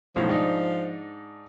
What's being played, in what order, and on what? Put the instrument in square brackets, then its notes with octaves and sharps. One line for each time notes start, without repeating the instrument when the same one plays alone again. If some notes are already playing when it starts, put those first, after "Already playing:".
[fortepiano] B1 A2 D#3 [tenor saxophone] F3
[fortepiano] G#2 D4 D#4